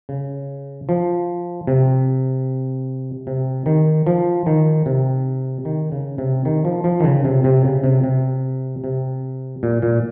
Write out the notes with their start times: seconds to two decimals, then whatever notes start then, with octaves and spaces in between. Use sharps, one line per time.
0.09 C#3
0.89 F3
1.67 C3
3.27 C3
3.66 D#3
4.07 F3
4.46 D#3
4.86 C3
5.65 D#3
5.92 C#3
6.18 C3
6.45 D#3
6.65 F3
6.84 F3
7.00 D#3
7.04 C#3
7.25 C3
7.44 C3
7.65 C#3
7.84 C3
8.04 C3
8.84 C3
9.63 A#2
9.82 A#2